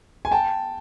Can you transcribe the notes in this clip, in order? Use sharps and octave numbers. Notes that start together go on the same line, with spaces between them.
G#5
G5 A5